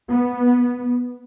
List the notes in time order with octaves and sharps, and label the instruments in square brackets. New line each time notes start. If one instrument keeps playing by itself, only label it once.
[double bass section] B3